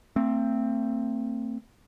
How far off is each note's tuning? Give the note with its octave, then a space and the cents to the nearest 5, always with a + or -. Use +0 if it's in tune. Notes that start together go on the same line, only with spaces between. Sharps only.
A3 +40 C4 +5